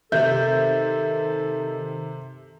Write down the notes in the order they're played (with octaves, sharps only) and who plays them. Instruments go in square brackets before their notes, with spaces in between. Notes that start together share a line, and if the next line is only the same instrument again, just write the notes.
[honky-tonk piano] C3 G6 [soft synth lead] D#3 [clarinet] A4 [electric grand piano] E5